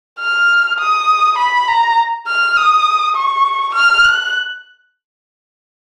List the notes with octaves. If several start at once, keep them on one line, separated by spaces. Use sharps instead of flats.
F6
D#6
B5
A#5
F6
D#6
C#6
F6
F#6